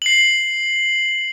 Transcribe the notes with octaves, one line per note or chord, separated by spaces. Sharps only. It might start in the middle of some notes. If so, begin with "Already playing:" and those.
C7 F#7